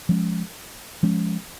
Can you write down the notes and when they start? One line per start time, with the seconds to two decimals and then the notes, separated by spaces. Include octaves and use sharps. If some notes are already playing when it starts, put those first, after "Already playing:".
0.09 F3 G#3 C#4
1.03 F3 G#3 C#4